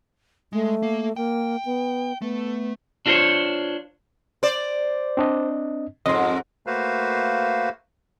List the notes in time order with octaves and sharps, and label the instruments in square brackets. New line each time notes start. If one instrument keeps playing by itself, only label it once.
[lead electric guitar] G#3 [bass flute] A3
[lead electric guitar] A#3
[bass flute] A#3 [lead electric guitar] G5
[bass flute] B3
[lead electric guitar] A3 [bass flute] B3
[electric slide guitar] D4 F4 F#4 A#4 C5 C#5
[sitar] C5 D5
[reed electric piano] C4 D4 D#5
[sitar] F2 G#2 [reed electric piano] D#5 C6
[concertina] A3 A#3 F#4 B4 C5 F5